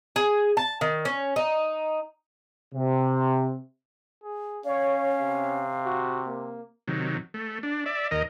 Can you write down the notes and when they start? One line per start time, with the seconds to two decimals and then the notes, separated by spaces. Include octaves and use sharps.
0.16 G#4
0.57 A5
0.81 D#3
1.05 C#4
1.36 D#4
2.75 C3
4.23 G#4
4.65 C#4 C#5 F5
5.19 C3
5.86 F#4
6.28 A#3
6.88 C3 D#3 F#3
7.34 A3
7.63 D4
7.86 D5 E5
8.11 D#2 A#4 D#5